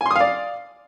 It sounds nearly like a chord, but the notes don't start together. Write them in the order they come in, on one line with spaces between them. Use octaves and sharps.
G#5 C6 D#6 F5 D5